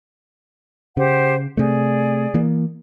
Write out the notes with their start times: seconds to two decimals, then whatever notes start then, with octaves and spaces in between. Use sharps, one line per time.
0.97 C#3 G4 C5 F#5
1.57 C3 A3 G#4 D5
2.34 E3 A#3